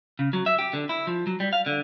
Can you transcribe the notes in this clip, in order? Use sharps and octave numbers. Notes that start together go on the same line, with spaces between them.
C#3
F#3
E5
G4
D3
E4
F3
F#3
G3
F5
D3